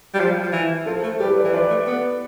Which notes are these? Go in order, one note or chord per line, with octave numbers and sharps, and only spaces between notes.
G3
F3
F3
E3
F3 A4 C5
A3
G3 G4 B4
B4 D5
E3
F3 B4 D5
A3
B3